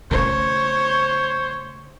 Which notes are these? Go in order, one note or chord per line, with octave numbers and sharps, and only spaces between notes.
C#3 A3 C5 C#5